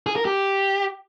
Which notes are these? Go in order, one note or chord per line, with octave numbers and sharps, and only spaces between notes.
G#4
A#4
G4